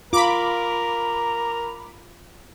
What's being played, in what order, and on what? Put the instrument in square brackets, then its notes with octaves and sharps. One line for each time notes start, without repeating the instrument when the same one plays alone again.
[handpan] F4 [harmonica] A#4 [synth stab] B5 D6